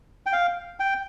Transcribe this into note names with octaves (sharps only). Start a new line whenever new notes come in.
G5
F5
G5